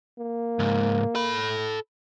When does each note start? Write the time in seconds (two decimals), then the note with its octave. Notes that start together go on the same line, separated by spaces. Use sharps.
0.19 A#3
0.59 C#2 G#2
1.15 A4 B5